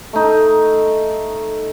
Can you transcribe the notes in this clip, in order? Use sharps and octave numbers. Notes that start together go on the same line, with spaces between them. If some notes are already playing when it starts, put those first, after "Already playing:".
A3 D#4